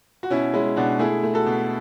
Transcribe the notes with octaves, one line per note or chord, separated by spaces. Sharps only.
F#4
B2 C#4 E4
G#3 C#4 E4
B2 D4 F#4
A3 E4 G#4
A3
F#4 A4
B2